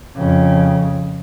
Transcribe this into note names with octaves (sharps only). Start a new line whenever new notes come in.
F2 C#3